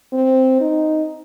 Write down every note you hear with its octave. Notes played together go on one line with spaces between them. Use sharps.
C4
D#4